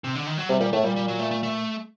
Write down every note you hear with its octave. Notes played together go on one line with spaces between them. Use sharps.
C3
D3
D#3
F#3
C3 G3
A#2 G3
A2 A3
A#2 G3
G3
F#3
A3
A3
A3